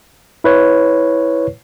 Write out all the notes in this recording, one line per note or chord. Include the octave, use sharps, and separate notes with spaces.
E4 B4 C#5